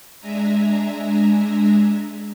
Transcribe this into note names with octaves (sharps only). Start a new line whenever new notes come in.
G#3 D4 E5 G#5 A#5